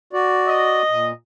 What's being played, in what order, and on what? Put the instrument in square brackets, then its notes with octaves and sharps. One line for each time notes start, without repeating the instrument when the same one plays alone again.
[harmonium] F#4 D5
[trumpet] D#5
[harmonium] A#2